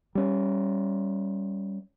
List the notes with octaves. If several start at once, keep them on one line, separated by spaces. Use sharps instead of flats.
G3 C#4